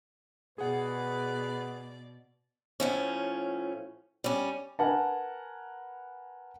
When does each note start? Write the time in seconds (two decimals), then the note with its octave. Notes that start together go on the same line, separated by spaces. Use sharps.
0.58 B2 G#4 B4 D5 F#5
2.80 A2 F3 C#4
4.24 G3 C#4
4.79 A#4 B4 F#5 G#5 A5